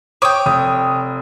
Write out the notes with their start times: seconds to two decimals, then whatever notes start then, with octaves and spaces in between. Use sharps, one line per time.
0.22 C#5 G5 D6 D#6
0.46 F1 D#6